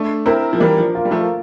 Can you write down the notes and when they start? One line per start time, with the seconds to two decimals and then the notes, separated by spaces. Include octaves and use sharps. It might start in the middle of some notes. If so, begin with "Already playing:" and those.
Already playing: A3 D4
0.26 C4 E4 A#4
0.53 F3
0.60 E3 G3 A#3
0.77 F3
0.95 F4
1.05 G3
1.11 F3 A3